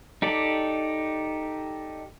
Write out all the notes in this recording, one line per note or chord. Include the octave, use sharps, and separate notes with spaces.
D#4 G4 A4 D5